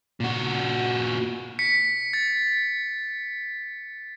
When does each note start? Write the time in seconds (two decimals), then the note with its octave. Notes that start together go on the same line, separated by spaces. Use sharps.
0.20 A#2 F#4
1.59 B6 C#7
2.13 A6